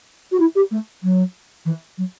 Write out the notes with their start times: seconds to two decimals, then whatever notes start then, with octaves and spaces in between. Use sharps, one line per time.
0.31 F#4
0.39 E4
0.55 G4
0.71 A3
1.03 F#3
1.65 E3
1.97 F#3